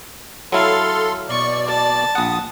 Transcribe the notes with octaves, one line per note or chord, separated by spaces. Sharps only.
F#3 E4 A4 F5 C6
B2 D5 C#6
A5
A#1 F#5 D#6